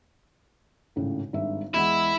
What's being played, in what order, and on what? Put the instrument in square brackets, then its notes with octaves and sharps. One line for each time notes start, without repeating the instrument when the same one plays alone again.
[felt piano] G#1 A2 C#3
G#1 G2 E5
[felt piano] E2 G#3 F#5 [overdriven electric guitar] E4